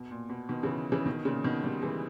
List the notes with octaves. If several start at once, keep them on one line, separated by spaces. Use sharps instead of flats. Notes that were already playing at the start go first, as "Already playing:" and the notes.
Already playing: B2
A#2
B2
B2 D#3
C#3 E3
C#3 E3
B2 D#3
A#2 C#3
B2 D#3
D#3 G3
E3 G#3